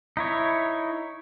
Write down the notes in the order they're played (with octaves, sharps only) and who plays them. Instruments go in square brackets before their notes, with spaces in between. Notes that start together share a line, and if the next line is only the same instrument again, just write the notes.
[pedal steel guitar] D#4 E4 C#5